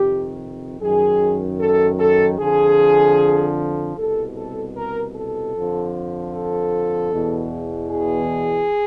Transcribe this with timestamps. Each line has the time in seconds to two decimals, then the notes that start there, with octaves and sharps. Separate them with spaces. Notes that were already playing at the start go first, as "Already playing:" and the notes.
Already playing: F2 C3 D#3 G4
0.81 F#2 D#3 G#4
1.59 A4
1.99 A4
2.38 F2 D3 F3 G#4
3.96 C2 B2 A4
4.35 A4
4.75 A#4
5.14 A4
5.54 F2 D3 F3
6.33 A4
7.12 E2 B2
7.90 G#4